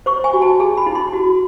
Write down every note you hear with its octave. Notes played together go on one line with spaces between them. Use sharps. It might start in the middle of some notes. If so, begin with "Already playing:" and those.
C5 C#6
G#5
F#4
A5
G#4 A5
B5
E4
C6
F#4